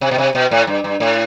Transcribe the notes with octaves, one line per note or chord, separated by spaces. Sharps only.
C3
B2
C3
B2
A2
G2
G2
A2